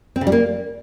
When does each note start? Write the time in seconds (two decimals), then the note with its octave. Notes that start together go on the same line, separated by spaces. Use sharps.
0.16 C4
0.21 C#3
0.27 G3
0.32 A#3